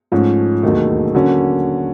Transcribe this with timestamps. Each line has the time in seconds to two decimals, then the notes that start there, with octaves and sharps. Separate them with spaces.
0.12 G#2 F3 A3 C#4
0.63 E1 D#2 D#3 F#3 A3
1.15 D3 F#3 A#3 C#4